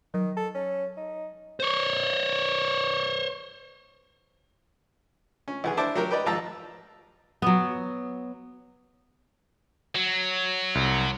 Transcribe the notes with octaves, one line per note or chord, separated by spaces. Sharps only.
D#3 F#3
A4
C#4
D#4
C5 C#5
C#4
B1 E3 G#4
D4 E4 C5 A5 D6
F#3 G4 A#4
G4 B4 D5 D#5
G#1 F3 A5 A#5 E6
F#3 B3
F#3
C2